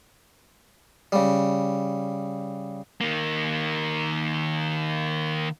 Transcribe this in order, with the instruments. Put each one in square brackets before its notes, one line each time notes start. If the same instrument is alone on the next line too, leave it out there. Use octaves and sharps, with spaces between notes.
[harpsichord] C#3 G3
[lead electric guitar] D#3 A#3